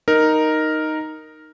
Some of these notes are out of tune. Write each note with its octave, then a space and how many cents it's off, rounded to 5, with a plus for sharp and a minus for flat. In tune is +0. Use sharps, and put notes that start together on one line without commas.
D#4 +0 A#4 +0